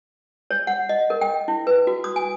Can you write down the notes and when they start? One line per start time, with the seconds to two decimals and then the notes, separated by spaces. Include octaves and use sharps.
0.51 C#5
0.67 F#5
0.89 D#5
1.10 A#4
1.21 G5
1.48 E4
1.67 B4
1.87 F#4
2.04 D#6
2.16 G#5